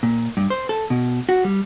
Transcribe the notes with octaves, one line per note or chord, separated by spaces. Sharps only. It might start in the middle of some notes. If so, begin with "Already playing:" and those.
A#2
G2
C5
A4
B2
F#4
G3